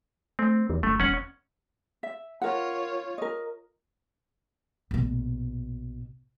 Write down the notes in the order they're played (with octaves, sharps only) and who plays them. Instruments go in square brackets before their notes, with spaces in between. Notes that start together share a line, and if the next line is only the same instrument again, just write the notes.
[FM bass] A3 [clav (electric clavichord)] C4
[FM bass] E2
[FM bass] G1 [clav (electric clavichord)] A3
[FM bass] E1 [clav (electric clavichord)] C#4 F#5
[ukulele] E5
[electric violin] F4 C#5 [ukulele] A#4 F#5
[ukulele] A#4 D#5
[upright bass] A#1 B2